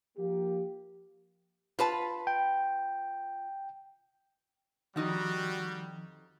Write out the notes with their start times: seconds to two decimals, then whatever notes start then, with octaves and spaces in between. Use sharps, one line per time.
0.18 F3 A#3 G4
1.79 F4 B4 A5
2.27 G5
4.96 F2 D#3 F3 G3 D#4 F#4 D#5